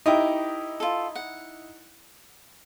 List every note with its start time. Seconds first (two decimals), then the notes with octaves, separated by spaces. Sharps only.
0.06 D#4 E4 G4 A#4 D#6
0.80 F4 A4
1.15 F#5